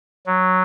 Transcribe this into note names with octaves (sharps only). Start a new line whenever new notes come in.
F#3